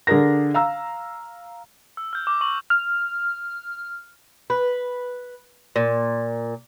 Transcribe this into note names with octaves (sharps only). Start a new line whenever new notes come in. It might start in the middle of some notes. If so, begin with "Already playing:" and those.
D3 D4 G#4 A#4 A#6
F5 A#5 E6
E6
F6 G6
D6
C#6 F#7
F6
B4
A#2